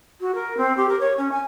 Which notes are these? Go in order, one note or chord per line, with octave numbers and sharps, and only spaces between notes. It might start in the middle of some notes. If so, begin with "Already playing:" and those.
F#4
A#4
C4
G4
A#4
C#5
C#4
G#5